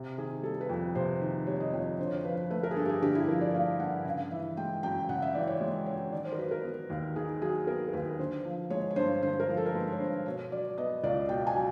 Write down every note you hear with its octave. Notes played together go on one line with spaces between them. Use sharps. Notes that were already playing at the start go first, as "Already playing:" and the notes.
Already playing: C3
D#3 G#4
G3 A4
B4
F2
C3 C5
D#3
G3 C#5
D#5
F2 C#5
C#5
D3 C5
C#5
C5
F3 B4
A3 B4
A#4
G#4
G2 A4
G4
G#4
D3 G4
E4
F3 A#4
D5
A3 F5
G2 F#5
C#3 F5
E3 E5
G#3 G5
F#2 G5
C#3 F#5
E5
E3 D5
C#5
G#3 C#5
F#2 C#5
D#3 D5
C5
A#4
F#3 B4
A#4
B3
D#2
D#3 G#4
F#3 G#4
B3 A#4
A#4
D#2 B4
B4
D3 C5
F3
G#3 C#5
C#5
G2 C5
D3 C5
A#4
F3
A4
A#4
G#3 B4
C#5
G2 C5
B2 C#5
F#3 D5
B3 D#5
C#2 D5
B2 G5
G#5
F#3